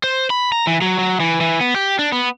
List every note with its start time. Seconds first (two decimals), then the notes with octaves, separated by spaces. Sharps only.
0.04 C5
0.30 B5
0.52 A#5
0.67 E3
0.82 F#3
0.99 F#3
1.20 E3
1.40 E3
1.61 B3
1.76 G4
1.99 D4
2.12 B3